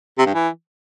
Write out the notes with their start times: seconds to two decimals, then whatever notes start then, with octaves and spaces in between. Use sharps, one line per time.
0.18 C3
0.26 G2
0.34 E3